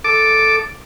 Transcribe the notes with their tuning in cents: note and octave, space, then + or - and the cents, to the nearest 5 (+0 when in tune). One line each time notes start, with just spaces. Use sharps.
A4 +0 D6 +0